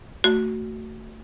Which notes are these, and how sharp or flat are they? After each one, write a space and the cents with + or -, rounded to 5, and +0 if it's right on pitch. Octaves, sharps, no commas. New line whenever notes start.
A3 +20 F#4 +5